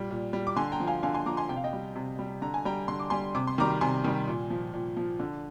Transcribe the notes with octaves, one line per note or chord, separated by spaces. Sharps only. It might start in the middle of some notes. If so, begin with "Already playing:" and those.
Already playing: A#2 G3
A#2
G3
D6
D3 G#5 C6
G5 A#5
F3
F5 G#5
D3 F5 G#5
G#5 C6
F3 A#5 D6
G#5 C6
C3 G5
F5
D#5 G5
G3
C3
G3
D3 A#5
G#5
G3 G5 A#5
D3 C6
D6
G3 G#5 C6
C3 D6
C6
D#3 G3 A#5 D6
C3 G#5 C6
D#3 G3
A#2
F3
A#2
F3
D3